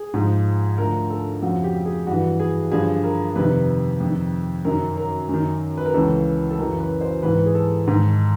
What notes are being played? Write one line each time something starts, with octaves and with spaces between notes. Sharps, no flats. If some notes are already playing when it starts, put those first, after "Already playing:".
Already playing: G#4
G#2 F3
D2 D3 F3 A#4
A4
F2 C#3 F3 F#4
G4
G#4
G2 E3 F#4
G#4
G2 D3 F3 G#4
A#4
F2 C3 D#3 B4
F2 C3 D#3
F#2 D#3 A#4
A#4
F#2 D#3
B4
A#4
C#2 C#3 E3 A4
A4
F#2 C#3 E3 A#4
B4
C5
G#2 E3 B4
G#4
A4
G#2 D#3